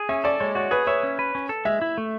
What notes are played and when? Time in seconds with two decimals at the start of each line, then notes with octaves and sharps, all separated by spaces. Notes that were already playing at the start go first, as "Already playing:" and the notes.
Already playing: G#4
0.09 C#4 E5
0.24 A4 D5
0.40 G#3 C#5
0.55 F#4 C#5
0.71 G#4 B4
0.87 C#5 E5
1.03 C#4
1.19 B4
1.35 C#4
1.49 A4
1.65 G#3 E5
1.82 E4
1.98 A3